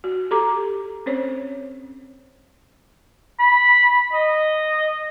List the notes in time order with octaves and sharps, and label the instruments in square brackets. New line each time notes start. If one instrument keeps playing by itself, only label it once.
[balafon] F#4
G4 A4 A#5 D6
C4 C#4 C5 C#5
[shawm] B5
D#5